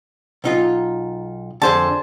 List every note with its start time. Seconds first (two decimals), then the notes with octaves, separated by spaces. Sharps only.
0.44 B1 D#4 F4
1.62 F2 D3 G#4 C5 A5